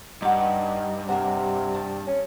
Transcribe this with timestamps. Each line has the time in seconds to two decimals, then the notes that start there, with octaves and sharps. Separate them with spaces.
0.22 G2 D#4 F#5 D6
1.08 C3 A#4 C5 F#5
1.75 A5
2.07 C#4